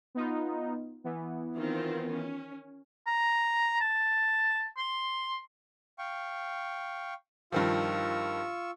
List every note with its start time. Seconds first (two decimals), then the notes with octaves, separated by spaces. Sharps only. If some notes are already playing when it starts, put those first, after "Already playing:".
0.15 B3 D#4 F4
1.04 E3 B3
1.57 D#3 C4 F4
2.11 C#4
3.07 A#5
3.80 A5
4.77 C6
5.99 F5 G5 C#6
7.52 G2 D#3 F3 F4 C#6 E6